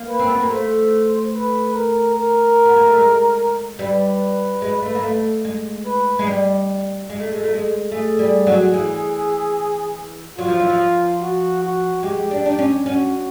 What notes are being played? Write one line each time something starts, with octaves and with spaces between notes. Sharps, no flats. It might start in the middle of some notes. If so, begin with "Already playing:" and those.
Already playing: A#3
B4
C4
B3
A#3
A3 C5
B4
A#4
A#4
B3
A#3
A3
G#3
G3 B4
G#3
A3
A#3
A3
G#3
B4
G#3
G3
G#3
A3
G#3
A3
G#3
A3 G#4
G3
F#3
E3
F#3 F4
F3
E3
F3
F#4
F#4
G#3 G4
D4
D4
C#4
C#4 F#4